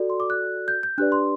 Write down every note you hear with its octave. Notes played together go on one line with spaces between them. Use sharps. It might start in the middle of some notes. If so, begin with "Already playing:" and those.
Already playing: F#4 A4 D5
C6
D6
F#6
G6
G6
D4 G4 B4 D5 F#6
C6